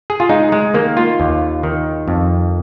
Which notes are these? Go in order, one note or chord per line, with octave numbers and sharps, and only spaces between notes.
G#4
F4
G#3 D#4
G#3
D#3 A#3
F4
D#2
D#3
F2